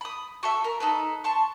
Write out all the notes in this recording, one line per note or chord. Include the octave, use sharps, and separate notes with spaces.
B5 D#6
F#4 A4 E5
A#4
D#4 A4 B4
A5 C6 C#6